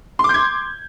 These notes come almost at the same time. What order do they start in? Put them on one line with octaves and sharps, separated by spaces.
C6 D6 G6 G#6